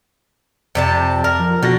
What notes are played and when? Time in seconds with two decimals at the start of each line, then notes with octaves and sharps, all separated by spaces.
0.75 F2 C3 G3 A5
1.24 A#4
1.39 F3
1.63 B2 D3 F#4 A#6